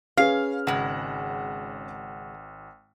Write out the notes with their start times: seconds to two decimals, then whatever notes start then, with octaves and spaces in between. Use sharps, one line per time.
0.17 C#4 G#4 B4 F5 F6
0.67 G#1 C#3 G#3 F#5